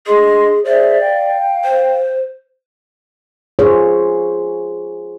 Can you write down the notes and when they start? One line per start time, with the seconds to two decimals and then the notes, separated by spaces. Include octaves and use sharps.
0.06 D4 G#4 D#5 C6
0.65 G#4 C5 D5 E5
0.99 F5 G5
1.64 C5
3.59 F4 G#4 C5 C#5